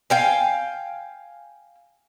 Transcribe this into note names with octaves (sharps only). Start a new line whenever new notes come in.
F5 G5 G#5